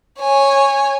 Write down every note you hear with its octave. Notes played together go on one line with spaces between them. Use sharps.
C#5 G#5